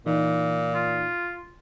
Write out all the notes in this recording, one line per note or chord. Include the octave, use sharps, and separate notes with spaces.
A#2 E3 D#4
F4